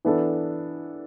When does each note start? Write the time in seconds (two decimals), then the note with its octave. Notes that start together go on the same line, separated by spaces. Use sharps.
0.05 E3 B3 D4 A4